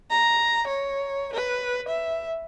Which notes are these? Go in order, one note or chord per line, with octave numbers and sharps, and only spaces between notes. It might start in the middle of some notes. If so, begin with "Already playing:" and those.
A#5
C#5
B4
E5